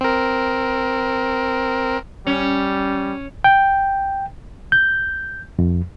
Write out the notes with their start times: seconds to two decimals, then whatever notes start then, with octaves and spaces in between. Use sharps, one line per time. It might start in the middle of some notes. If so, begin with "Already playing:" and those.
0.01 C4 A#4
2.27 G3 C#4
3.44 G5
4.72 G6
5.59 F2